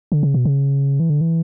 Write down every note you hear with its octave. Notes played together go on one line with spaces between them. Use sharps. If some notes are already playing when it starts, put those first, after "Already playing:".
D3
C#3
B2
C#3
E3
D3
E3